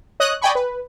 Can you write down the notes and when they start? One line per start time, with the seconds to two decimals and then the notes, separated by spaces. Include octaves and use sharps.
0.20 C#5 D#5 D#6 F#6
0.42 D5 D#5 G5 G#5 B5 C#6
0.55 B4